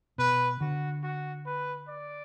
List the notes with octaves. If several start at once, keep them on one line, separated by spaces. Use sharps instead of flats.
B2 B4
D3 F#4
F#4
B4
D5